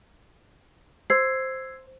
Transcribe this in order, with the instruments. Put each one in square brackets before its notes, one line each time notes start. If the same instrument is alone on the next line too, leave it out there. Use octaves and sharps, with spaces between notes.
[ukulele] C5 [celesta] E6 G#6 C7